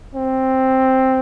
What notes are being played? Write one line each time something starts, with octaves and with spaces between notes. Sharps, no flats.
C4